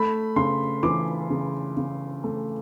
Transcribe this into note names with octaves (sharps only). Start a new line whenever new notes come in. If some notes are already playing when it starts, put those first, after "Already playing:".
Already playing: A3 B5
C#3 C6
E3 D6
C#3
C#3
A3